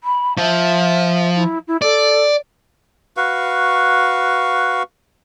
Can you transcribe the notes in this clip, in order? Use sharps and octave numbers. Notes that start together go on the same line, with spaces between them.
B5
F3 E5
E4
E4
A4 D5
F#4 B4 F5 C#6